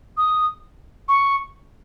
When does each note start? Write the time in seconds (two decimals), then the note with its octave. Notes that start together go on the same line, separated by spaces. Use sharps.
0.17 D#6
1.08 C#6